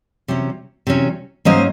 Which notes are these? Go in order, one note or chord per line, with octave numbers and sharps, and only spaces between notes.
C3 F#3 C#4
C3 F#3 C#4
G#2 F#3 A#3 C#4 C5 D#5